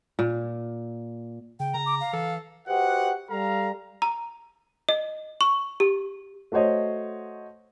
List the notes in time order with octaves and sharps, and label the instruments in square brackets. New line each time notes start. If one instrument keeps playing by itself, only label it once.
[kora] A#2
[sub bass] C#3 [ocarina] G5
[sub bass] C#3 [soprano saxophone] A#5
[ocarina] D6
F5
[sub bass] E3 [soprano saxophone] A4
[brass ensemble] F#4 G4 B4 C5 D#5 F#5
G3 A4 F5 A#5
[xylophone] A#5
D#5
C#6
G4
[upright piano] A3 F#4 C5 C#5 D#5